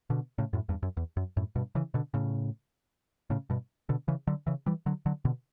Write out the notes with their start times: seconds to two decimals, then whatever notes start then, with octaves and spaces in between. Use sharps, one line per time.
0.10 B2 D3
0.38 A2 C#3
0.53 F#2 A2
0.69 E2 G2
0.83 F#2
0.97 E2
1.17 F#2
1.37 F#2 A2
1.56 G2 B2
1.75 C#3 E3
1.94 B2 D3
2.14 A2 C#3
3.30 A2 C#3
3.50 G2 B2
3.89 B2 D3
4.08 C#3 E3
4.27 D3 F#3
4.47 C#3 E3
4.66 E3 G3
4.86 D3 F#3
5.06 D3 F#3
5.25 B2 D3